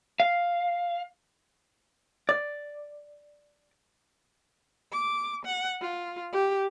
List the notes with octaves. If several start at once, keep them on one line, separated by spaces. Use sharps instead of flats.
F5
D5
D6
F#5
F4
G4